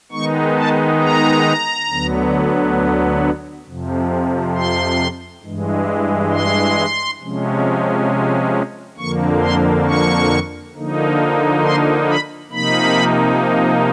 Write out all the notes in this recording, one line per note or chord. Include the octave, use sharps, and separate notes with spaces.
D#3 G#3 B3 D#4 C#6
A5
A#5
D2 D3 F#3 B3
F2 C3 F3
C6
G2 E3 G#3
C6
C3 F3 G#3 C#4
F2 D3 F3 A#3 C#6
C6
C#6
D3 F3 A#3 D#4
C6
B5
C3 F3 A#3 D#4 B5